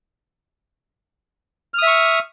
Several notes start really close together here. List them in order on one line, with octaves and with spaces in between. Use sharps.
F6 D#6 E5 C#6